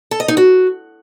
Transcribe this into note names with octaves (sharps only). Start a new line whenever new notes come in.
A4
D#5
D#4
F#4